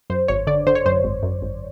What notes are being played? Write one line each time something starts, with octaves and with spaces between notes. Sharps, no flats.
F#2 C5
G#1 C#5
D3 D5
D3 C5
C#5
F#2 C5
G#1
F#2
G#1